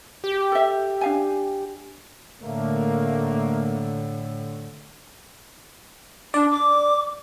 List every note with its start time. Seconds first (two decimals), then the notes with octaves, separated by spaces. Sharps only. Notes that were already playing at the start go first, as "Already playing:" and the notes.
0.24 G4
0.52 A4 E5
1.01 D4 F5 G#5
2.43 A2 D3 A3 A#3
6.34 D4 D5
6.51 D6